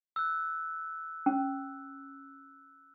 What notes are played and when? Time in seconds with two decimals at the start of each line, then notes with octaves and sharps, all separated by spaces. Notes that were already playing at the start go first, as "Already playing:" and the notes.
0.16 E6 F#6
1.26 C#4